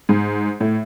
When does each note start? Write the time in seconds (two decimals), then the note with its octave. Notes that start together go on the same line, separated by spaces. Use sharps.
0.09 G#2
0.60 A2